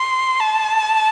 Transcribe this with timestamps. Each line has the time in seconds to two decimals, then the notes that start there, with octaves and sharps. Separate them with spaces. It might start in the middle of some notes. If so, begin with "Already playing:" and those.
Already playing: C6
0.41 A5